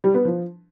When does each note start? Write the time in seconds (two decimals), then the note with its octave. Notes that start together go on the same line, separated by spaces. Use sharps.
0.04 G3
0.14 B3
0.25 F3